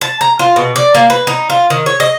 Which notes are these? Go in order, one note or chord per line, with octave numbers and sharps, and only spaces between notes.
A5
A#5
F4
B2
D5
A#3
B4
D#4
F4
D#3
C#5
D#5